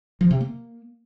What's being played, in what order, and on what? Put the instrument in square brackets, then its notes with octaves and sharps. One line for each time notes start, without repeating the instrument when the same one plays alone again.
[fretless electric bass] F3
C3
A#3